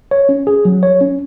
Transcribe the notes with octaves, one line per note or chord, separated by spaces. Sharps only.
C#5
C#4
G#4
F#3
C#5
C#4